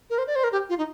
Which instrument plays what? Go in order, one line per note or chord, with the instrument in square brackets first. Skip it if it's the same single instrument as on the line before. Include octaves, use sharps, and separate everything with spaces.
[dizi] A#4
C5
D5
C5
A#4
G4
F4
D#4